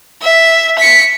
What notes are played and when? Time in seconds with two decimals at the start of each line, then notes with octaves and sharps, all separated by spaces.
0.22 E5
0.78 B6 C#7